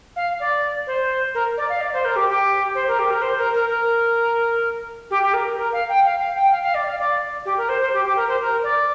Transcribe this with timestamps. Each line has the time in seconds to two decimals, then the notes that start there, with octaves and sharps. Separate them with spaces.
0.16 F5
0.40 D5
0.87 C5
1.34 A#4
1.57 D5
1.69 F5
1.81 D5
1.93 C5
2.05 A#4
2.16 G4
2.29 G4
2.75 C5
2.88 A#4
2.99 G4
3.10 A#4
3.22 C5
3.38 A#4
3.54 A#4
3.70 A#4
5.10 G4
5.22 G4
5.33 A#4
5.58 A#4
5.73 F5
5.89 G5
6.05 F5
6.20 F5
6.36 G5
6.51 F5
6.63 F5
6.74 D5
6.87 F5
6.99 D5
7.45 G4
7.57 A#4
7.69 C5
7.81 C5
7.93 G4
8.04 G4
8.16 A#4
8.28 C5
8.40 A#4
8.63 D5